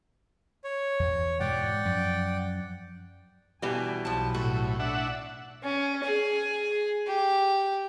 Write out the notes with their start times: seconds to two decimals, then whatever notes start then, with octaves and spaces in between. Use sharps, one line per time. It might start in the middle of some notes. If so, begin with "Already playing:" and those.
0.64 C#5
1.00 E2 E3
1.40 G#2 B2 E3 D5 F#5 G5
1.85 F#2 F3
3.62 B2 E3 G3 D4 G#5
4.05 B1 F3 A5
4.34 A2 F#4
4.80 D4 E5 F#5
5.64 C#4
6.04 G#4
7.07 G4